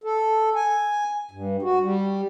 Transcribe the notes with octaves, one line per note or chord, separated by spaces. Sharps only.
A4
G#5
G2
F#4
G3